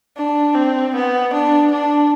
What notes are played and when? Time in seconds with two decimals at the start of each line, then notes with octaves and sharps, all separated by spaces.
0.17 D4
0.55 C4
0.94 B3
1.33 D4
1.72 D4